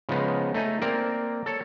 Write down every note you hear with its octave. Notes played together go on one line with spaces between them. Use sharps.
C#3 F3 G#3 B3 D#4
A3 D#4 G#5
A#3 C4 A#4 D5
A4 C#5